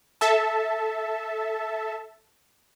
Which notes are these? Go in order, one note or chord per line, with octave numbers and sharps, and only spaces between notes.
A4 E5 A5